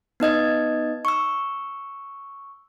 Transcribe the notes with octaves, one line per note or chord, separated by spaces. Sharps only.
B3 D#4 D#5 G#6
C#6 E6